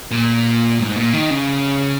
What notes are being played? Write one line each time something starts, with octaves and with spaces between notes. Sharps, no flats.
A#2
G#2
A#2
D#3
C#3